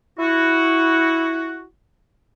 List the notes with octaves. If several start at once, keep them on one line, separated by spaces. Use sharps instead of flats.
E4 F#4